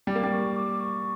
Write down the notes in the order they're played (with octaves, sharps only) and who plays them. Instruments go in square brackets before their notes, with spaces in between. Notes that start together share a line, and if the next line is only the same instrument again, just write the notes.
[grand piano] G3 [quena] D6
[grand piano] A#3
G3
[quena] C#6
D6
C#6